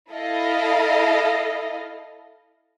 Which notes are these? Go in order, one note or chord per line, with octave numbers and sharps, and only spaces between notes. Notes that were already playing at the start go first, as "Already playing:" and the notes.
E4 A4 D#5 F5